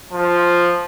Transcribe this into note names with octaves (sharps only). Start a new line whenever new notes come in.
F3